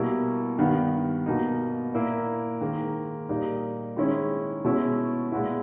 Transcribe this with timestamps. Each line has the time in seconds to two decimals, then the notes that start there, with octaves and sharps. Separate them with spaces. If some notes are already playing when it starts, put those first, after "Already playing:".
Already playing: B2 G3 A#3 E4
0.58 G2 D#3 G3 B3
1.26 B2 A#3 D#4
1.94 A#2 A#3 E4
2.61 G#2 D#3 A#3
3.29 A#2 G3 A#3 D#4
3.96 G#2 D#3 G#3 C#4 E4
4.64 B2 G#3 C#4 E4
5.32 A#2 G#3 B3 E4